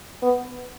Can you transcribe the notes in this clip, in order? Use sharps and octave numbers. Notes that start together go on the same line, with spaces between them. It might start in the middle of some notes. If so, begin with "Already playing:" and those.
B3